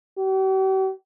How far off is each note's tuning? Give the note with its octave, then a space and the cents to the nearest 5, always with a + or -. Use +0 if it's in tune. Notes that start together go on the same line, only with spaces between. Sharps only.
G4 -45